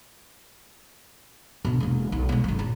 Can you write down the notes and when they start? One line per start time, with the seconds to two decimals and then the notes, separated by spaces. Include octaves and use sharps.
1.65 B2 D3
1.80 E1 A#3
2.12 B1
2.29 B2 G#3
2.44 F#1 F#3
2.59 A#1